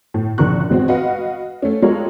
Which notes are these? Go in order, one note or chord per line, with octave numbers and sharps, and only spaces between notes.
A2
A#1 A#2 C#3 A#4 C#6 F#6
A1 G#3 C4 F#4
F#4 B4 D#5 F5 F#5
A3 C#4
G#3 F4 G4 A4 A#4 C#5